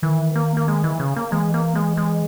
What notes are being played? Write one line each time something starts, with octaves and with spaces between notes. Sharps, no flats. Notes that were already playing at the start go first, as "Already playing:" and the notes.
D#3 E3
A#3
A#3
G#3
E3
C#3
A#3
E3 G#3
A#3
G#3
G#3